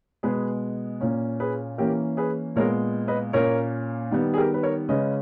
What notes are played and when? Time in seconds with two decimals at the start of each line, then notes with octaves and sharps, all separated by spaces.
0.23 B2 G#3 B3 G#4 B4
1.01 A#2 A#3 C#4
1.40 G#4 B4
1.78 E3 A#3 C#4 G4 A#4
2.17 G#4 B4
2.56 A#2 G#3 B3 A#4 C#5
3.08 B4 D#5
3.33 A#2 A#3 C#4 A#4 C#5
4.11 D#3 G3 B3
4.34 G#4
4.37 G4 A#4
4.54 B4
4.63 A#4 C#5
4.89 C#3 G#3 C#4 B4 D#5